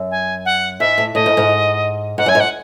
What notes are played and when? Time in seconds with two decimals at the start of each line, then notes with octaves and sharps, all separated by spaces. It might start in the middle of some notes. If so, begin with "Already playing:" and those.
Already playing: F#2
0.11 G#5
0.45 F#5
0.80 G#2 E5
0.98 A2
1.14 A2 D#5
1.26 G#2
1.37 G#2
2.18 G#2 F#5
2.26 F#2 G#5
2.35 G#2
2.40 F#5